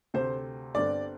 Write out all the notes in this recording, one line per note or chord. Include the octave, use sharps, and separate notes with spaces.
D2 C3 A3 C4 C5
G1 G2 D3 C4 D5